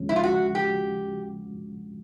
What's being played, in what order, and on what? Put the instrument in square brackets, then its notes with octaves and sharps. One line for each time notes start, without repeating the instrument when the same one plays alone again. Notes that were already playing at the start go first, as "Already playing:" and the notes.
Already playing: [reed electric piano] D#2 C#3 F3 G#3 C#4
[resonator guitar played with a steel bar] E4
F4
F#4
G4